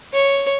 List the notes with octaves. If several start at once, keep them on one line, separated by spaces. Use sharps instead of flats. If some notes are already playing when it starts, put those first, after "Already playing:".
C#5